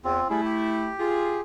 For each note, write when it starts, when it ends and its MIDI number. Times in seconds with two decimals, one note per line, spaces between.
0.04 0.20 40
0.04 0.28 60
0.04 0.28 65
0.30 0.41 55
0.30 0.90 57
0.30 0.90 64
0.30 0.41 68
0.45 1.41 67
1.00 1.41 65
1.00 1.41 68